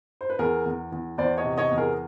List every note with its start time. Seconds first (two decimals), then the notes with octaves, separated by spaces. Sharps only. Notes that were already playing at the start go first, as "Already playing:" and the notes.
0.21 C5
0.30 B4
0.39 E2 G#4 A#4
0.66 E2
0.92 E2
1.18 E2 C5 D5
1.38 C#5 D#5
1.44 C3
1.58 C#5 D#5
1.71 E2
1.78 G#4 A#4